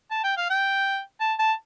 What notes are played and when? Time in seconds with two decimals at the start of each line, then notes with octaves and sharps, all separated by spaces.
0.10 A5
0.23 G5
0.37 F5
0.50 G5
1.20 A5
1.39 A5